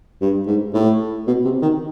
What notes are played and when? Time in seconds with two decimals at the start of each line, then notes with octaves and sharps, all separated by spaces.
0.21 G2
0.47 G#2
0.74 A2
1.27 B2
1.44 C3
1.62 D#3